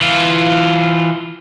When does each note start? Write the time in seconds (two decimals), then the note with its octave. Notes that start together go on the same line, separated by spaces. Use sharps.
0.01 E3 F4